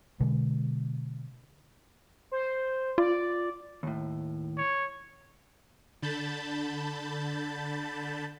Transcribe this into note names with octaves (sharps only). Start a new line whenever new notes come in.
B2 D3 G#3
C5
F4 D5
D#2 A2
C#5
D3 A5 B5 G6 A6